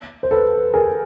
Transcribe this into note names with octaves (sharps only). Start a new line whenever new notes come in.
C5
A4 B4
G#4 A#4